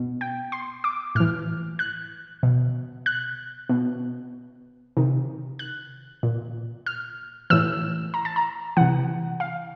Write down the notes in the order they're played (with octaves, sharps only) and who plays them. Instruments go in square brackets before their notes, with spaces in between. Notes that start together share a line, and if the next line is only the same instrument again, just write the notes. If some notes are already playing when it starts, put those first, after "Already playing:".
Already playing: [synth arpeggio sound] B2
G5
C6
D6
A2 E3 F6
F#6
B2
F#6
B2
C3 D#3
F#6
A#2
F6
A2 E3 E6
A#5
A5
A#5
C3 E3 F#5
F5